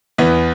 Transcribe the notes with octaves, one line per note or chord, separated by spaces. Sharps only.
E2 E3 B3